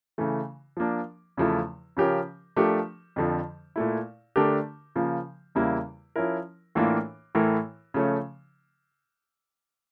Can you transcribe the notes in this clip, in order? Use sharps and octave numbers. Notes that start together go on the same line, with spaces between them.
C#3 E3 A3
F3 A#3 D4
E2 C#3 F3 A3 E4
C#3 F3 C#4 G4 A#4
F3 A3 D4 G4 A#4
F2 D3 F3
A#2 A3 E4
D3 A3 D4 G4 A#4
C#3 F3 A#3
E2 C#3 G3 A#3 E4
F3 C#4 E4 A#4
A2 E3 A#3 D4 F4
A2 E3 A3 E4 A#4
C#3 F3 A3 C#4